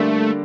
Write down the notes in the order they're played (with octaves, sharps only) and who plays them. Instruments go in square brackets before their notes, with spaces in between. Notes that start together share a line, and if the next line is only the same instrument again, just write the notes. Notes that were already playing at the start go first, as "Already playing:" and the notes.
Already playing: [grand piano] D3 G3 A#3 D4 [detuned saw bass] A3